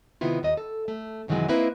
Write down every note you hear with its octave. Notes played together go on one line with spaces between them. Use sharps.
C3 D#3 B3 E4 F4
D#2 D#5
A4
A3
F#2 C3 D#3 E3 F#3 G#3
A#3 C4 D#4 E4 B4